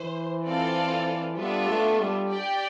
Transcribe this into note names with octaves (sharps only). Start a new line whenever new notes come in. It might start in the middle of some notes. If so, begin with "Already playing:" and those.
Already playing: E3 C5
C4 F4 A4 D5 F5
G3 B3 D4 F4 A4 E5
A3
G3
G4 D5 G5